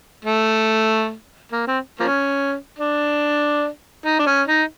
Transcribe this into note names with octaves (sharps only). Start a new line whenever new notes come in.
A3
A#3
C4
F3 A#3 C#4
D4
D#4
D4
C#4
D#4